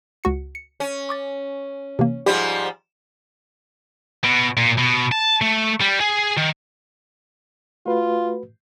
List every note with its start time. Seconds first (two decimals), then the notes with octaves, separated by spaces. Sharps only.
0.24 C#2 F#4 C#7
0.55 C#7
0.80 C#4
1.09 C#6 D6 A6
1.99 C3 E3 A#3
2.26 G#2 F3 G3 G4
4.24 B2
4.57 A#2
4.78 B2
5.12 A5
5.42 A3
5.81 G3
6.01 G#4
6.38 D#3
7.86 A3 F4 F#4 B4